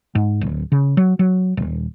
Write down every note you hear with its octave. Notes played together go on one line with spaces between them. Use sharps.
G#2
D1
C#3
F#3
F#3
D#1